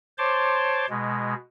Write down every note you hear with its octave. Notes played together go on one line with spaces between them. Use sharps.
C5 C#5 A5 C6 D6
B2 G#3